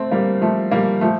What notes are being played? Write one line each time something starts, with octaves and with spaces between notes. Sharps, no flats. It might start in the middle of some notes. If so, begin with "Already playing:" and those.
Already playing: A3 C4
G3 A#3
F3 A3
G3 A#3
F3 A3